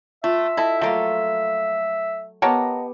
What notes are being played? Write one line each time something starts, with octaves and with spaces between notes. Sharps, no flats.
A3 F4 E5
E4 A4 D#5 A5
F3 F#3 A3 A#3 F4 D#5
B3 G4 A#4 C#5 D#5 F#5 A5 A#5